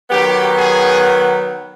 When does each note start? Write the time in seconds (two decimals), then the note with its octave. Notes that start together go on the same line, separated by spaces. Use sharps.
0.10 D#3 F#3 B3 G4
0.57 G#4